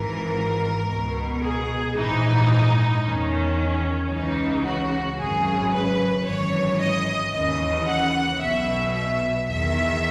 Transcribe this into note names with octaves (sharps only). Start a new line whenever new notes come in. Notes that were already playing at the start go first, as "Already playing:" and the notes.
Already playing: G#1 G#2 E3 A#4
C#2 B2
G#4
A#1 G#2 E3 D#4
E2 D#3 C#4
C#2 C#3 E3 D#4
F#4
G#1 F#2 C#3 G#4
B4
G#1 F#2 E3 C#5
D#5
D#2 C#3 E3 D#5
F#5
B1 B2 E5
E5
E2 D#3 E5